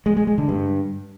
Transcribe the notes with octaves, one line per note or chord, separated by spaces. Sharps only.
G#3
G#3
G#3
D3
G2